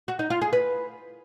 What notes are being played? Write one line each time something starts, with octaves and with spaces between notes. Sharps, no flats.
F#4
D#4
F4
G#4
B4